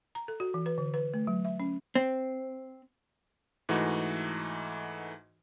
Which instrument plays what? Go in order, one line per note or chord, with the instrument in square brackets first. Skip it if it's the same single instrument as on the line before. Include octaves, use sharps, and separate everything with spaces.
[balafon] A#5
A4
F#4
E3
B4
D3
B4
A3
F#3
E5
C#4
[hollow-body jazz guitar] C4
[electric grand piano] G#2 E3 A3 D#4 F#4